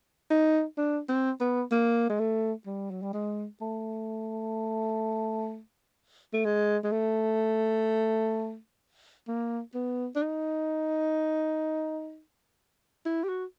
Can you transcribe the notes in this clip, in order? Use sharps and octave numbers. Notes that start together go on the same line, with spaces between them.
D#4
D4
C4
B3
A#3
G#3
A3
G3
F#3
G3
G#3
A3
A3
G#3
G#3
A3
A#3
B3
D4
D#4
E4
G4
F#4